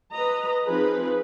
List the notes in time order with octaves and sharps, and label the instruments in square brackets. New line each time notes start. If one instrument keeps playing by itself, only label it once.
[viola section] B4 D#5 A#5
F3 C4 D#4 F4 G#4 B4